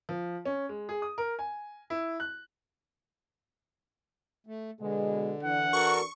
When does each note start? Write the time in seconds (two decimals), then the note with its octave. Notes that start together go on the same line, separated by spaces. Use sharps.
0.09 F3
0.45 C#4
0.69 G#3
0.89 G#4
1.02 D#6
1.18 A#4
1.39 G#5
1.90 E4
2.20 F#6
4.47 A3
4.80 B2 D3 G#3
5.43 E3 D4 F#5
5.73 F#4 A4 A#4 C#6